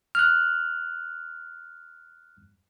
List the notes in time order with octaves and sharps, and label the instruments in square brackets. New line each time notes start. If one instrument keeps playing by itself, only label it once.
[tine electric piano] F6 F#6